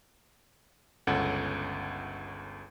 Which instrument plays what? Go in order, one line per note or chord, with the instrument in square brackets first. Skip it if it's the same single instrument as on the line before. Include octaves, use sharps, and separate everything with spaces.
[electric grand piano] G1 C#2 C#4 A4 F#5